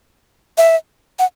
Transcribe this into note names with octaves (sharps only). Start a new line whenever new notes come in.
E5
F#5